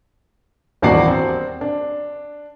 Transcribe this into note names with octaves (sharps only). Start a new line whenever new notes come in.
D#1 E2 D4 F#4 D5 C7
C4
D4